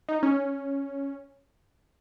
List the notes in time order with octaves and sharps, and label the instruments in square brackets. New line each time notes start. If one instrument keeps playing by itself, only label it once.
[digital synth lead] D#4
C#4